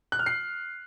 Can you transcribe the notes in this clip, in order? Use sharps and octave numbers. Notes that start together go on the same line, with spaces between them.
F#6
F6
C7